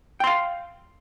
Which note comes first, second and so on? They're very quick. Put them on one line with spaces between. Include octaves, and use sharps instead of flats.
G5 C6 F5